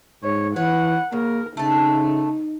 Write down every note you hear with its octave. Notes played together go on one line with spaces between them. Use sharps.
G#2 C#5
E3 B4 C#5 F#5
C#3 A#3 A#4
C#3 A3 D#4 A5